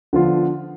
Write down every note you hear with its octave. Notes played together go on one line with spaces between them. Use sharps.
D3 F3 B3 F4